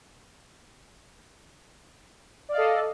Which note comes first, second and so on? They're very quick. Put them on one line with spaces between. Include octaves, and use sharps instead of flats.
D5 F5 D#5 A4